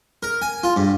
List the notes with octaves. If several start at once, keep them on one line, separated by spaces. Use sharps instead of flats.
A#4
G#5
F4
G2